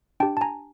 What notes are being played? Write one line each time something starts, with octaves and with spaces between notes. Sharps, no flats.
D4 G4 G5 A5
A5
G#5 A#5